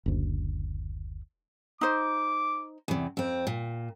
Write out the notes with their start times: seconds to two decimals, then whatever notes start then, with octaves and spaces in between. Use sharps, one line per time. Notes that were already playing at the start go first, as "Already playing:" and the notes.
0.06 F#1 D2
1.81 D#4 C5 D6
2.88 E2 C3
3.17 F2 C4
3.47 A#2